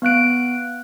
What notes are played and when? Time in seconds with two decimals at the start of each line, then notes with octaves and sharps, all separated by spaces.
0.02 B3 F5 F#6 D7